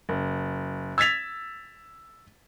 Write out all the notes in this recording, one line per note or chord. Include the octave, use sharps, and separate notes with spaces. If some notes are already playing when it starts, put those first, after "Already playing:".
F#1
E6 G#6 A6 B6 F7